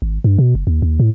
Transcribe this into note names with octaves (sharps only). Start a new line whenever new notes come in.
G#1
G2
B2
F#1
D#2
D#2
A2